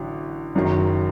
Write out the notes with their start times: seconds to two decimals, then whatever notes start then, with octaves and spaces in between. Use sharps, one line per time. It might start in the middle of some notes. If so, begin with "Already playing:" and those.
Already playing: A1 D3 F#3
0.55 F#1 F#2 D#3 F#3